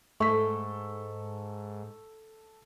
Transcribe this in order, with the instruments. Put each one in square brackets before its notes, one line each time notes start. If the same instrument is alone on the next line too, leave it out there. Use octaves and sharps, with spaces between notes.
[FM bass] G#2 [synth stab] A3 [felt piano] A4 B6 [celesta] C#6